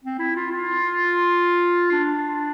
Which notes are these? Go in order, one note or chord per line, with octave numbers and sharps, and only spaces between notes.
C4
E4
F4
F4
D4